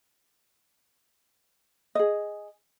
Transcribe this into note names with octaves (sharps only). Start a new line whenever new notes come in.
G#4 D#5